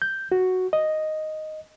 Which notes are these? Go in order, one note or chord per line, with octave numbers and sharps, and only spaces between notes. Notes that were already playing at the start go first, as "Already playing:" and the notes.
G6
F#4
D#5